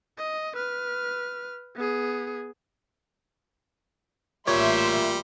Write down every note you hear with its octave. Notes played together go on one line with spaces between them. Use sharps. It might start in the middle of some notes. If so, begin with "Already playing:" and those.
D#5
B4 F6
B3 G#4
A1 A#2 G3 C#5 E5 C6